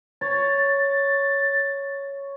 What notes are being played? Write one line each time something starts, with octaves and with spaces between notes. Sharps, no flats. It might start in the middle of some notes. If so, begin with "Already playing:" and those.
C#5 A6